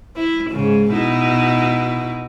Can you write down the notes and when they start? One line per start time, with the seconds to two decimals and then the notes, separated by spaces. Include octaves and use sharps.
0.16 E4
0.50 G#2 C#3 G#3
0.92 B2 D#4 E4